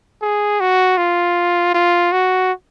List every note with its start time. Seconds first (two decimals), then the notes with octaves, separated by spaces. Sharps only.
0.21 G#4
0.60 F#4
0.97 F4
1.74 F4
2.12 F#4